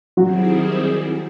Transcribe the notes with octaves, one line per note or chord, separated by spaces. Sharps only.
D#3 F#3 G3 C4 E4 F#4 G#4